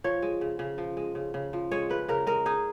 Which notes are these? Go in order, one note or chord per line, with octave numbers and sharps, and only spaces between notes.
F3 C#5
G#3
C#3
C#3
F3
G#3
C#3
C#3
F3
G#3 C#5
C#3 B4
C#3 A#4
G#3 A#4
D#4 G#4